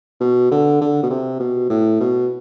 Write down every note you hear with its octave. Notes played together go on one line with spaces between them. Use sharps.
B2
D3
D3
B2
C3
B2
A2
B2